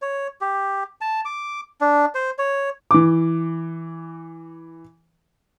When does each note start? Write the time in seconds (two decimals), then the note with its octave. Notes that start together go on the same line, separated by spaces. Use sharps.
0.02 C#5
0.41 G4
1.01 A5
1.25 D6
1.81 D4
2.15 C5
2.38 C#5
2.91 E3 D6